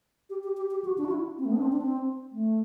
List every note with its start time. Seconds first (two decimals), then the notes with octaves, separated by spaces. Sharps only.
0.30 G4
0.43 G4
0.57 G4
0.71 G4
0.84 F#4
0.98 D4
1.05 F#4
1.11 E4
1.38 C4
1.45 A3
1.52 B3
1.57 D4
1.62 C4
1.72 D4
1.82 C4
2.32 A3